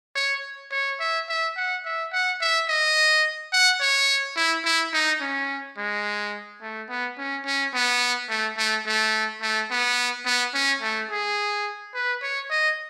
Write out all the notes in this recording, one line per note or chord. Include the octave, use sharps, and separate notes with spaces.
C#5
C#5
E5
E5
F#5
E5
F#5
E5
D#5
F#5
C#5
E4
E4
D#4
C#4
G#3
A3
B3
C#4
C#4
B3
A3
A3
A3
A3
B3
B3
C#4
A3
G#4
B4
C#5
D#5